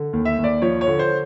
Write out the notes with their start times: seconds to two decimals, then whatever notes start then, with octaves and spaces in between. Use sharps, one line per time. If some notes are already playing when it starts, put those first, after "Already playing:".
Already playing: D3
0.13 D#2
0.25 E5
0.38 D#2
0.44 D5
0.62 F3 C#5
0.81 C#5
0.87 D3
0.99 C5